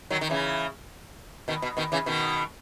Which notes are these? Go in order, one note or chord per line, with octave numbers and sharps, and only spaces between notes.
D#3 F#3
D#3
C#3 E3
B2 D#3
B2
B2 D#3
C#3 E3
B2 D#3